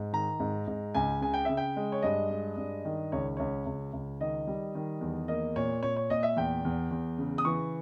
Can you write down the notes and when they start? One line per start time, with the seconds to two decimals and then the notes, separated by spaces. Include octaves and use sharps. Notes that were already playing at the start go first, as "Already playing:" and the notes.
Already playing: G#2
0.13 D#3 A#5
0.40 G#2
0.67 G#2
0.94 C#2 G#5
1.21 C#3 G#5
1.34 G5
1.45 C#3 E5
1.57 G5
1.76 G#3
1.92 C#5
2.03 G2 D#5
2.30 G#3
2.57 G2
2.85 D#3
3.12 C#2 C#5
3.37 C#2 C#5
3.66 C#2
3.93 C#2
4.21 D#3 D#5
4.47 G3
4.75 D#3
5.01 E2
5.28 A#3 D#5
5.56 A#2 C#5
5.83 A#2 C#5
5.96 C#5
6.10 A#2 D#5
6.23 E5
6.36 E2 G5
6.65 E2
6.91 E2
7.18 C#3
7.38 D#6
7.45 E3 C#6